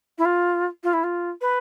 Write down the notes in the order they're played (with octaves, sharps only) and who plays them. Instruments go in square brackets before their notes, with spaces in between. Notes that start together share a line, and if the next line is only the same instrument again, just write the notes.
[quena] E4
F4
F4
E4
F4
B4